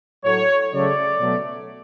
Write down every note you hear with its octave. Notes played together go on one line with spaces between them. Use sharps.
A2 F#3 A3 C#5
C#3 F#3 A3 D5
B2 F#3 A3